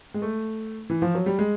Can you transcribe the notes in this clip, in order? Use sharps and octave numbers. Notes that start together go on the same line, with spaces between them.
G#3
A3
E3
F3
F#3
G3
G#3